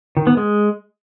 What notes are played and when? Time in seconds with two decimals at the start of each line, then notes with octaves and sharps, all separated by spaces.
0.17 D#3
0.27 B3
0.37 G#3